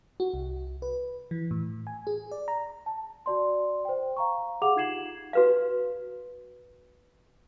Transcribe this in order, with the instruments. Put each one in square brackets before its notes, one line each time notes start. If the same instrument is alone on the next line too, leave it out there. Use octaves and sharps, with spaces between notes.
[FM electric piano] F#4
C2
B4
E3
A2
G#5
G#4
D5
A#5
[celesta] A5
F#4 D5 C6
C5 G5
F5 A#5 C#6
G4 G#4 F5 F#5 D6 F7
D#4 F4 G#6 C7 E7 F#7
[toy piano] F#4 B4 F5